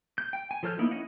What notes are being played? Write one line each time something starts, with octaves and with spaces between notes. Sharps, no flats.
G6
G5
G#5
F3 A4 C#5 F6 G6
A#3 B3 D#4 E4
C#4 E4 D#5 F#5